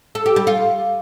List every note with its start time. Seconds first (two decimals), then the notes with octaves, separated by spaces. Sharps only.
0.15 A4
0.26 G4
0.36 G3
0.47 F4